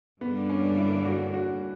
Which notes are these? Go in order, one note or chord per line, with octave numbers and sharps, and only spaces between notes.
G2 D3 G3 A#3 B3 D4
C#4
E4
F#4
F#4